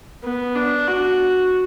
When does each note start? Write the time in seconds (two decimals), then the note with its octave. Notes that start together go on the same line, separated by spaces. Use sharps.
0.23 B3
0.56 D4
0.88 F#4